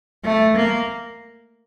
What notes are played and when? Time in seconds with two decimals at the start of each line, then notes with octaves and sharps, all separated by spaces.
0.24 A3
0.56 A#3